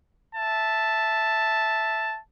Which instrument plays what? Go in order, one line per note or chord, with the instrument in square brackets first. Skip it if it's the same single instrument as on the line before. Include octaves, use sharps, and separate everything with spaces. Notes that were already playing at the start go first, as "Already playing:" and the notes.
[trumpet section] E5 A5